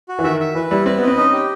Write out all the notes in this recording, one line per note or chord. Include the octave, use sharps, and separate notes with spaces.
F#4
E3
D#3 E5
E5
E3 B4
G3 E4
C4 B4
B3 D#5
C4
C#4 D#4
G4